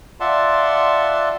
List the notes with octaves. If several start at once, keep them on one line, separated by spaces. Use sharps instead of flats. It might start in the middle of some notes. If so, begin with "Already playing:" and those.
F4 D5 E5 F#5 A5 C6